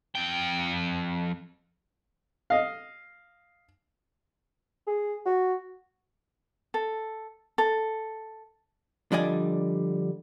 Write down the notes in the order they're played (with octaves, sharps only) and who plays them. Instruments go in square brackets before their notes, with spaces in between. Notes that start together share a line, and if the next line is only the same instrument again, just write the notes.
[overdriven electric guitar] F2 G5
[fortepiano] D#5 F5
[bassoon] G#4
F#4
[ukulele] A4
A4
[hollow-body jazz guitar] D3 F3 G3 D5 D#5 G#5